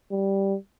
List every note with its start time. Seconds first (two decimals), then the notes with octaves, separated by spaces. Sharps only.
0.12 G3